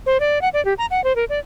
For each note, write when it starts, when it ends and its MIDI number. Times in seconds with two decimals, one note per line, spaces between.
0.06 0.20 72
0.20 0.41 74
0.42 0.49 78
0.54 0.63 74
0.65 0.74 67
0.78 0.86 82
0.91 1.03 78
1.04 1.15 72
1.16 1.25 70
1.30 1.39 74